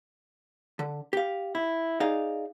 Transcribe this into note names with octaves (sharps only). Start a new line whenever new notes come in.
D3
G4 F5
E4
D#4 G#4 D5 F5